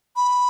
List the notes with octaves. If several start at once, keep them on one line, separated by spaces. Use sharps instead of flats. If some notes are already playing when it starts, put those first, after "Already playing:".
B5